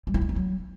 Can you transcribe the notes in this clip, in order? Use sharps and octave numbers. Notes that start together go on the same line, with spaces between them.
G3
E4
G#3
D#4
F#3